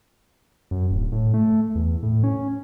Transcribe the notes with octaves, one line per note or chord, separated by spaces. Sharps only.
F#2
D1
A2
A3
E2
A2
C#4